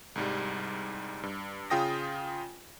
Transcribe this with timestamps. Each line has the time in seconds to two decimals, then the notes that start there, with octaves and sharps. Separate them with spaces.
0.15 C2 G#2 G3
1.23 G2
1.70 C#3 F4 G5 D#6 A#6